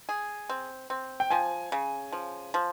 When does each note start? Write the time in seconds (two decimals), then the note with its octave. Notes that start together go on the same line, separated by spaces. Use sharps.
0.09 G#4
0.49 C4
0.90 C4
1.20 G5
1.30 F3 G#5
1.72 C#3
2.12 F3
2.54 F3